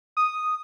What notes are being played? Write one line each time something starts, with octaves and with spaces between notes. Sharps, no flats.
D#6